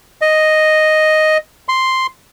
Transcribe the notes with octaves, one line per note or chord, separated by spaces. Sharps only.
D#5
C6